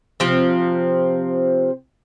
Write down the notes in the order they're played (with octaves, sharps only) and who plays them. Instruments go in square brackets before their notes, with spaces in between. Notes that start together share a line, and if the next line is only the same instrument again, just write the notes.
[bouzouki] C3 F3 C4